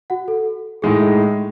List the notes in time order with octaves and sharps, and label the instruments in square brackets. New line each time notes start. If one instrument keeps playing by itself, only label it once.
[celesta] F#4 F#5
A4
[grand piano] A2 G#3 D#4 [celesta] G#4